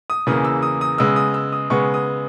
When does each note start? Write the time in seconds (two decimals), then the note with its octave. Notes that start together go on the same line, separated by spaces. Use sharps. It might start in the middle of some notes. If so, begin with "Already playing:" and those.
0.10 D#6
0.27 E2 C#3 E3 A#3 D#6
0.45 E6
0.62 D#6
0.81 D#6
0.98 C#3 G#3 B3 E6
1.16 D#6
1.34 E6
1.52 D#6
1.70 C#3 G#3 B3 C#6
1.94 D#6